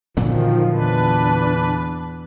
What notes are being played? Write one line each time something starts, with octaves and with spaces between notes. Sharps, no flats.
A#2 D3 D#3 F3 F#3
E2 D4 B4